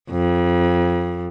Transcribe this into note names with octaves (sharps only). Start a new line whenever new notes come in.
F2